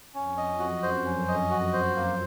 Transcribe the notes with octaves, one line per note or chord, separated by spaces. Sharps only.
F2 C#4
D#5
F#2 F#4
C5
F#2 C#4
D#5
F#4
C5
A#3